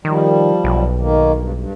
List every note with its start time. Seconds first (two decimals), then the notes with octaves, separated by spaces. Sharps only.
0.05 D#3 F3 G3
0.64 B1
1.00 D#3 A#3
1.35 G2
1.54 G2